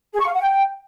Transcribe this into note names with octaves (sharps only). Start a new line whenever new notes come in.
G#4
C#6
F5
F#5
G5